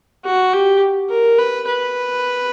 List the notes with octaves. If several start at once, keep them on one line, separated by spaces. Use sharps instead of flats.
F#4
G4
A#4
B4
B4